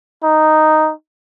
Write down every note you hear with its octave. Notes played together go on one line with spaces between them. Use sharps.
D#4